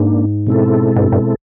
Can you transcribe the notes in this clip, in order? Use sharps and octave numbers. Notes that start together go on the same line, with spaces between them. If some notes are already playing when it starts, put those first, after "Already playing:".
Already playing: G#2 A#3 D4
B2 G#3 C4 E4 A4
G#2
G2
G2